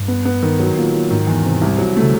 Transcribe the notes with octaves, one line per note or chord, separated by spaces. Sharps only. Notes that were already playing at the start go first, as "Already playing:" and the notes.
Already playing: G2
B3
B3
D#3
F#3
A#2
F#3
G#2 D#3
E2
C3
C2
F#3
A3
C#3